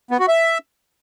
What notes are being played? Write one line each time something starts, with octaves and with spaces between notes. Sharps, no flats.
B3
F#4
E5